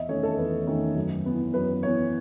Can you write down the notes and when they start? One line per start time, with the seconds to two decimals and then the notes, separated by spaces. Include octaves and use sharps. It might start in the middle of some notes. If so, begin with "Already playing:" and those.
Already playing: E2 D#5 E5
0.09 D#3 A3 C#4 C#5
0.23 A4
0.37 E2 B4
0.67 D#3 A3 C#4
0.96 F#2
1.26 E3 B3
1.54 F#2 B4
1.83 E3 B3 C#5